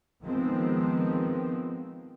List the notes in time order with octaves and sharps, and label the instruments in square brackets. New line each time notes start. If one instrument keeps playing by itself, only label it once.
[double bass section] D#3 F3 G#3 B3 C4